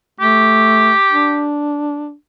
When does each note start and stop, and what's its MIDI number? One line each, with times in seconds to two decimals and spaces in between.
0.20 0.92 57
0.20 1.45 67
1.12 2.14 62